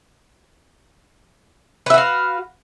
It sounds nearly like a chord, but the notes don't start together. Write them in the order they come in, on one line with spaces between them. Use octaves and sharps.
B4 E5 F#4 F5